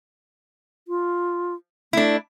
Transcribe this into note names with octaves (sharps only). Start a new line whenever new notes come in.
F4
A3 D4 E4